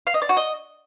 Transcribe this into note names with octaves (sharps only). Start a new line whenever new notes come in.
F5
D#5
D5
F#4
D#5